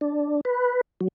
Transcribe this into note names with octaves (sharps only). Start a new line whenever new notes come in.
D4
B4
F#3